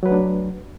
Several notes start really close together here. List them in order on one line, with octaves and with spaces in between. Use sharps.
F#3 B4 A3 D4